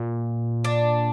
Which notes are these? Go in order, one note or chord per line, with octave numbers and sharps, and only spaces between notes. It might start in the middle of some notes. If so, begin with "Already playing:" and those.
Already playing: A#2
D4